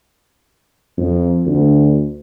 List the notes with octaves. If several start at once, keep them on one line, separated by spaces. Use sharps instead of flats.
F2
D2